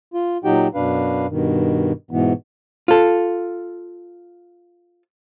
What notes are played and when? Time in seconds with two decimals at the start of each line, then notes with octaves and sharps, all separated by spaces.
0.14 F4
0.44 A#2 F#3 D#4 F#4 G4 G5
0.75 F#2 B2 D4 B4 F5
1.29 G2 B2 D#3
2.11 G#2 B2 E3 B3
2.88 F4 A4